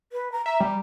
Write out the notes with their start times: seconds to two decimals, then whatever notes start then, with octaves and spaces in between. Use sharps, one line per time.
0.12 B4
0.32 A#5
0.46 E5 A#5
0.60 G3